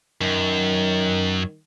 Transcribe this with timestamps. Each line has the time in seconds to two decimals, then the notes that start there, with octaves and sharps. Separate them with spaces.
0.21 F#2 D#3